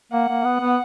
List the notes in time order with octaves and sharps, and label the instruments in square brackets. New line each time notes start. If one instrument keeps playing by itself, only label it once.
[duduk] A#3 [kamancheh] F#5
[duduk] A#3
B3
B3